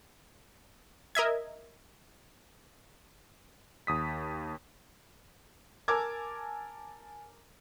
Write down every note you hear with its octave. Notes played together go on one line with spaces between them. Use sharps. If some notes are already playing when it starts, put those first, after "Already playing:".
A#4 D#5 E5 G#6
D#2 D#6 B6
A#4 G#5 A5 D6 E6 G#6